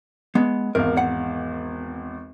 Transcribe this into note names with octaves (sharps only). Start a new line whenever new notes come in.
G#3 B3
G#1 E2 A#4 F5
F#5